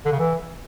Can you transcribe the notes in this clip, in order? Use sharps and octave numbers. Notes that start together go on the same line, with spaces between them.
D3
C#3
E3